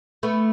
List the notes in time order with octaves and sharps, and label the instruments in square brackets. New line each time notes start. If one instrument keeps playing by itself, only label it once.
[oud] A3 B3